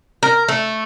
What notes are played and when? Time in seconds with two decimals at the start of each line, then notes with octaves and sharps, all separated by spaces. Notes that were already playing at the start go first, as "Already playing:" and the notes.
0.23 A#4
0.48 A3